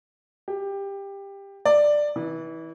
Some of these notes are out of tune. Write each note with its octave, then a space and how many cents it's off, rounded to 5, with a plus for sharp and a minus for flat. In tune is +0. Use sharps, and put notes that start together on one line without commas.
G4 +15
D5 +10
E3 -25